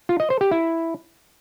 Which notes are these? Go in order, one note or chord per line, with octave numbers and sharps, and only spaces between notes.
F4
D#5
C5
G4
E4